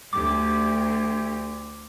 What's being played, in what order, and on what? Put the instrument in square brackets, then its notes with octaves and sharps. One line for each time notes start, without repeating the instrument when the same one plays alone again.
[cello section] D2 G4 [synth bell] D6